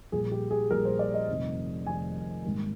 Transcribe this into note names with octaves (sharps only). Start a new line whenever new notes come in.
A#1 A#2 G3 G#4
G4
G#4
A#1 A#2 G3 A#4
C5
D5
D#5
F1 F2 C3 D#3 G3
F1 F2 C3 D#3 G3 G#5
G#1 G#2 D#3 G3 A#3